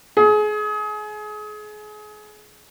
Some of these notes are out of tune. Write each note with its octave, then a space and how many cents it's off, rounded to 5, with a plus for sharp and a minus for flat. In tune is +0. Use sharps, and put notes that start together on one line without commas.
G#4 +30